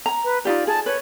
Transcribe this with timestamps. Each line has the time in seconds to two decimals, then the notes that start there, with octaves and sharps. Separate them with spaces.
0.06 A#5
0.24 B4
0.45 D#4 F4 G4 D5
0.67 G#4 A5
0.86 B4 C#5